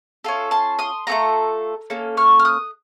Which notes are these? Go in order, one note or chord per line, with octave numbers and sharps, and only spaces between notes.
C#4 F4 A4
A5 C6
C6 D#6
A3 C4 F4 A4 A#5 C#6
A#3 C#4 A4
C#6 F6
F6
D#6 F#6